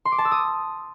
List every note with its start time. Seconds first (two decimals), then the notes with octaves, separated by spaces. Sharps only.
0.05 C6
0.12 D6
0.18 A5
0.25 E6
0.31 D#6